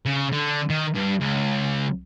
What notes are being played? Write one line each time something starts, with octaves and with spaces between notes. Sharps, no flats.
C#3
D3
D#3
G2
C#2